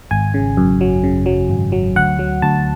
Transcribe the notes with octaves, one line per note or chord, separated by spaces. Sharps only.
G#1 G#5
C#3
F#2
F#3
C#3
F#3
G#1
F#3
D2 F#5
F#3
D2 A5